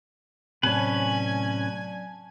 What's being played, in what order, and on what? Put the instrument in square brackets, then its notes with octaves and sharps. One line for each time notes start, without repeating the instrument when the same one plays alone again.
[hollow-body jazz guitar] A2 C3 [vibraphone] F#3 D5 A5 [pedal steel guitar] C#4 B4 [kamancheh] G#5